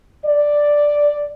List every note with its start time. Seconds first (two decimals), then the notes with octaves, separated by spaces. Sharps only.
0.25 D5